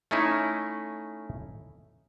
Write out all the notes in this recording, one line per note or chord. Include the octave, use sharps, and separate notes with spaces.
A3 C#4 D#4 E4